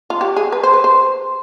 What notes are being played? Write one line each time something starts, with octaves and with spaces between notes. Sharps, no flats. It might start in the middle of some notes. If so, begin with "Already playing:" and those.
F4
G4
G#4
B4
C5
B4
C5